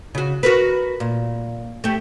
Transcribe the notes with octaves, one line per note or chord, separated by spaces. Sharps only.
C#3 F#4
F#4 A#4 B4
A#2
A3 G4